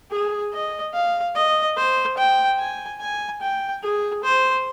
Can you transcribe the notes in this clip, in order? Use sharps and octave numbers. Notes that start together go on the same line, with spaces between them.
G#4
D#5
F5
D#5
C5
G5
G#5
G#5
G5
G#4
C5